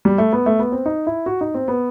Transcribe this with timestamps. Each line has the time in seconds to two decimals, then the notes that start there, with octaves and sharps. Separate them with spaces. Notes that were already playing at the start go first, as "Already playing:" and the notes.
0.05 G3
0.18 A3
0.33 B3
0.46 A3
0.59 B3
0.72 C4
0.86 D#4
1.07 E4
1.26 F#4
1.41 D#4
1.54 C4
1.68 B3